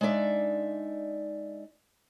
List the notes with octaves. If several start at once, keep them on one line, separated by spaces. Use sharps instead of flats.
G#3 D4 D#4 D5 E5